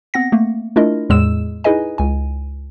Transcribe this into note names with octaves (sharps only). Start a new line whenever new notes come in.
B3 C4 F#5 A#6
A3 A#3
A3 D4 E4 F4 A#4 D#5
E2 A2 G#3 G#4 E6 E7
D#4 E4 G#4 B4 D#5 G#5
C#2 G#5